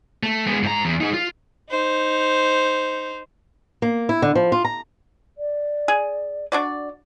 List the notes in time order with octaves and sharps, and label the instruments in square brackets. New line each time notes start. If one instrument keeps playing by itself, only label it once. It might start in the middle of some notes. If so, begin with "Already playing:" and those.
[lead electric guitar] A3
G#3 B3
G#2 A#5
E2
D#4 G#4
F4
[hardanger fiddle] D#4 C5
[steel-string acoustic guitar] A#3
E4
D3
F3
F4
A#5
[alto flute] D5
[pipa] G#4
D4 F#4 D5